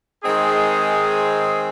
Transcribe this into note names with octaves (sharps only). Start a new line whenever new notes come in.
D#3 G#3 C4 D#4 G#4